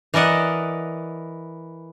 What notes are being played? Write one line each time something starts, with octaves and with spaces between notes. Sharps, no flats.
E3 A#4 D5 D#5 F#5